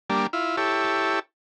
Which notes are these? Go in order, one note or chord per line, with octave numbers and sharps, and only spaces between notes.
G3 A#3 D4
E4 F4
E4 G4 A4 C#5